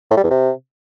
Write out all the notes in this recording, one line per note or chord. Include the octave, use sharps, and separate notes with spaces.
A2
G3
E2
C3